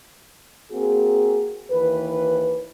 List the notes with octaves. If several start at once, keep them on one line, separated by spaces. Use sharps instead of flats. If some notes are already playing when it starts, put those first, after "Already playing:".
A#3 C4 F#4 G#4
D#2 E3 B4